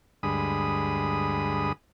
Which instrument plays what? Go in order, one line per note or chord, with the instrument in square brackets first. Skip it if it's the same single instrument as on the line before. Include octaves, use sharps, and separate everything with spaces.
[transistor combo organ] D2 G2 G#3 B5 D#6